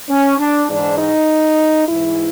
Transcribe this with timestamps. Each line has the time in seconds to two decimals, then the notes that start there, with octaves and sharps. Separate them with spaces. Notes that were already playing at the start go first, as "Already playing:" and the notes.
0.08 C#4
0.38 D4
0.68 G#2 E3 D4
0.98 D#4
1.88 G#2 E3 E4